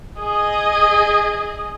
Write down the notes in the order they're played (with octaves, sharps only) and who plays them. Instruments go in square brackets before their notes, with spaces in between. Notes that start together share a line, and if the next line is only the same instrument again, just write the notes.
[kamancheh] G#4 D#5